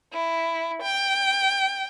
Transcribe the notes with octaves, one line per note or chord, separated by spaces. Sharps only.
E4
G5